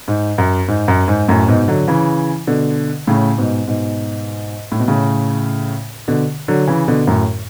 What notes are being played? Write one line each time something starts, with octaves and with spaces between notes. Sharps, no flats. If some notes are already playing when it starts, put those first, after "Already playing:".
G#2
F#2
G#2
F#2
G#2
F#2 A2
G#2 B2
D3 F#3
C#3 E3
B2 D3
A2 C#3
G#2 B2
G#2 B2
A2
B2
A2 C#3
B2 D3
D3 F#3
C#3 E3
B2 D3
F#2 A2